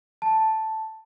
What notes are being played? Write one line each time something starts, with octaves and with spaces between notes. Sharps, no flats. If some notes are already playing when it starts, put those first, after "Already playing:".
A5